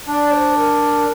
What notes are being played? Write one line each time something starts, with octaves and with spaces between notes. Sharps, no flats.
D4 D5
C5
A#4